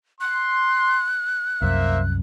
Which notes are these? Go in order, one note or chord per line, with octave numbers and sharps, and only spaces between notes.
C6 F#6
C2 F#2 A#3 C5 E5